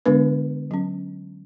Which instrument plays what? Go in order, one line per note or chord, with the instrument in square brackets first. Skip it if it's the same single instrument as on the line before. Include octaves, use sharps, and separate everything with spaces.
[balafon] D3 G#3 B3 D4 B4
F#3 C#4